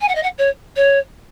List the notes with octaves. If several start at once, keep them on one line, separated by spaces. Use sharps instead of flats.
G#5
F#5
D#5
F#5
C#5
C#5